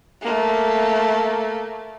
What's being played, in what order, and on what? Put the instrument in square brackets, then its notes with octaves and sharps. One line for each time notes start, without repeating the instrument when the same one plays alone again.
[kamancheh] A3 A#3